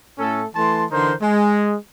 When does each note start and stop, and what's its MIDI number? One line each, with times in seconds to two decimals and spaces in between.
0.19 0.43 45
0.19 0.43 57
0.19 0.43 61
0.19 0.43 69
0.56 0.84 52
0.56 0.84 57
0.56 0.84 81
0.56 0.84 84
0.92 1.12 50
0.92 1.12 52
0.92 1.12 63
0.92 1.12 70
0.92 1.12 72
0.92 1.12 84
1.22 1.74 56